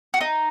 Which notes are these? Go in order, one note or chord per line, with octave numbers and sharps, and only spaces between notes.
F#4
D#4